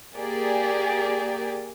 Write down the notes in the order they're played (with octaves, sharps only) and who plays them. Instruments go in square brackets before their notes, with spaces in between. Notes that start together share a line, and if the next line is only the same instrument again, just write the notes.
[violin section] A#3 G4 G#4 D5